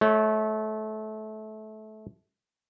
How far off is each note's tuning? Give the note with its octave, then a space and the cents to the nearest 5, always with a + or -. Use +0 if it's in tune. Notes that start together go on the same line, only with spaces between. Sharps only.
A3 -25 C#5 +0